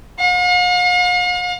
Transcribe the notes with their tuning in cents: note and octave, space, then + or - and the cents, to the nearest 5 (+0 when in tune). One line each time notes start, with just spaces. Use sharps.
F5 +45